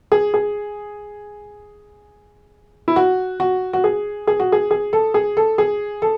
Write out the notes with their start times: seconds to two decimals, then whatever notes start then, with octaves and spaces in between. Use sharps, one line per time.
0.12 G#4
0.34 G#4
2.88 E4
2.96 F#4
3.40 F#4
3.73 F#4
3.84 G#4
4.27 G#4
4.40 F#4
4.52 G#4
4.71 G#4
4.93 A4
5.14 G#4
5.37 A4
5.58 G#4
6.02 A4